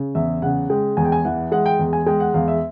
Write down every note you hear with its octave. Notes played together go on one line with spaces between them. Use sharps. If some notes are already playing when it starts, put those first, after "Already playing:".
Already playing: C#3
E2 E5
C#3 F#5
G#3 G5
E2 G#5
G5
G#5
E3 F#5
G#3 F#5
G5
E2
G#5
G#3 G5
F#5
E2 F5
E5